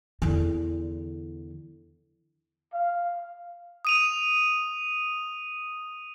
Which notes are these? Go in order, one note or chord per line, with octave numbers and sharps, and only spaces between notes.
E2 D3
F5
D#6 D#7 F7